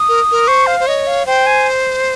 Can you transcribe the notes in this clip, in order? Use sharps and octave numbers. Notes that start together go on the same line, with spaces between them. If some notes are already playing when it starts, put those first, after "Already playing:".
Already playing: D#6
A#4
A#4
C5 C#6
F5
C5
C#5 D#5
F5
C5 G5
G#5